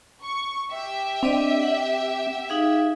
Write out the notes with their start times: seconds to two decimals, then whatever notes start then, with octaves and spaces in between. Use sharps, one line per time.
0.24 C#6
0.73 G4 E5
1.23 C4 D4 D5 D#5
1.62 F#5
2.49 D#4 G#4 F5